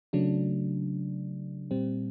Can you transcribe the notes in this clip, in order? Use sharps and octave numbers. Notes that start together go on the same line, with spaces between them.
C#3 F#3 A3 D4
A#2 G3 C4